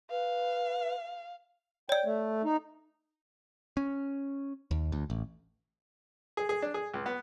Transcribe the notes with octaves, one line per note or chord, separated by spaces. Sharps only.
B4 F5
C#5 D5 G5
A3
D#4
C#4
D#2
D2
A1
G#4
G#4
D4
G#4
C#2
B3